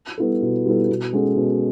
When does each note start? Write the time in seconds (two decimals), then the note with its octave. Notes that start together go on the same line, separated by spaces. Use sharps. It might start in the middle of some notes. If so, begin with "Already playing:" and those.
0.18 G3 B3 E4 A4
0.42 B2
0.66 G3 B3 E4 A4
0.89 B2
1.13 G#3 C#4 F#4 A4
1.36 B2